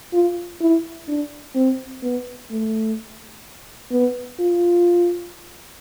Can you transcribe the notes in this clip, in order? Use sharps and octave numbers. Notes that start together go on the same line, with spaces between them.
F4
E4
D4
C4
B3
A3
B3
F4